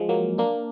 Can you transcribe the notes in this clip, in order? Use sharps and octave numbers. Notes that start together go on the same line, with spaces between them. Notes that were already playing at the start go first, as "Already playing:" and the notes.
Already playing: F3 G#3
F#3 A#3
A#3 D4